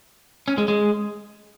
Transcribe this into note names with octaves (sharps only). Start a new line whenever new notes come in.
C#4
G#3
G#3